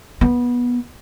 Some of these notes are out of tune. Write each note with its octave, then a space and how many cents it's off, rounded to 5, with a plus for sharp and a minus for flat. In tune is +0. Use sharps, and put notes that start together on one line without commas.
B3 -20